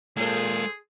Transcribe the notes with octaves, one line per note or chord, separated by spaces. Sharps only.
A#2 G#3 A#3 G#4 A4 C5